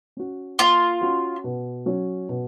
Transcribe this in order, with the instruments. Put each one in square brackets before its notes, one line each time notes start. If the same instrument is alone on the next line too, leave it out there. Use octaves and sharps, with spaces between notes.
[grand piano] C#4 F#4
[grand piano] A#3 [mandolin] F4
[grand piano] C#4 F#4
B2
F#3 C#4 F#4 C#5
B2